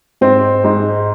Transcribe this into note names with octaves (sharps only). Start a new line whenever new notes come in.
G#2 C4
G#2